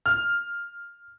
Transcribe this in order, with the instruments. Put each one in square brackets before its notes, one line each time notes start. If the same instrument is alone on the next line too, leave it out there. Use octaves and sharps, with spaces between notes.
[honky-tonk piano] F6